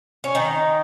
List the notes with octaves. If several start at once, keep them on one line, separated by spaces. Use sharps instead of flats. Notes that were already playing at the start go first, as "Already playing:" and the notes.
C#4
D#3 D#4